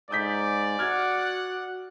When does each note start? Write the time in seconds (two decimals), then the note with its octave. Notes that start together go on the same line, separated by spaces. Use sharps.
0.11 G#2 D5 D#6 G6 B6
0.79 F#4 F#5 F6 G#6